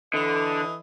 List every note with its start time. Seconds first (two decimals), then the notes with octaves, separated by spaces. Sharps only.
0.14 D3 E3 A4 D#5